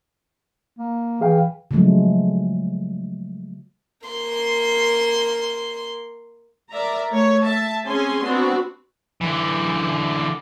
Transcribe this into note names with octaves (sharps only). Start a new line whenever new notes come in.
A#3
E3 G#4 F5 G5
C#3 F3 F#3 G#3 A3
A#3 C6
A#4 D5 E5 A#5
A3 C#5
E5 A5
C4 C#4 G#4 G#5 C6
B3 C4 D4 F#4
D3 E3